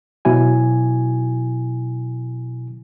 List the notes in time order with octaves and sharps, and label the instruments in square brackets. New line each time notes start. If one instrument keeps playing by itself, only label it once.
[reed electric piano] B2 F#3 E4 G#5